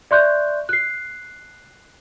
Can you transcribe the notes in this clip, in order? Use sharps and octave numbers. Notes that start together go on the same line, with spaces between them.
D5 E5 C6 C#6 F#6 G6
F#6 C7